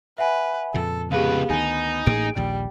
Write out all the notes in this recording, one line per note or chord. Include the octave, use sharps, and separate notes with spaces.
B4 E5 F#5 G#5
F2 A#2 C#3 A4
C#2 B3 G4 G#4 B4 F5
D2 D#3 D#4 G#5
A1 A2 A#3 G#4 D7
A#1 D#2 A#2 G3